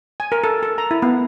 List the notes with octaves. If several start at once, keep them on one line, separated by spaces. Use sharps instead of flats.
G#5
A#4
A4
A4
A#5
E4
B3